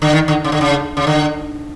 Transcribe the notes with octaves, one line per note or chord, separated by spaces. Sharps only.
D3
D#3
D3
C#3
D3
C#3
C#3
D3